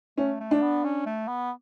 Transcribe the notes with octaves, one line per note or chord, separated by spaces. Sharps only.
A3 C#4
A3
D4
B3
C#4
A3
B3